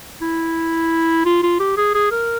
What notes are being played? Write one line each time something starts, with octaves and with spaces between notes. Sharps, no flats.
E4
F4
F4
G4
G#4
G#4
A#4